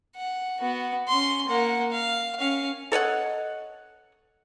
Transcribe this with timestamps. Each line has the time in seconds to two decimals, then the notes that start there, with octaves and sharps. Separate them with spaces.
0.16 F#5
0.61 B3 F#4
1.08 C#4 C6
1.48 A#3 F#5
1.92 F5
2.39 C#4 F5
2.92 A4 C#5 D#5 F#5